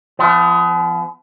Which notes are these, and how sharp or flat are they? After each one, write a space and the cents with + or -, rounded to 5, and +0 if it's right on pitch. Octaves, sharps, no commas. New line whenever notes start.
F3 -25 B3 +35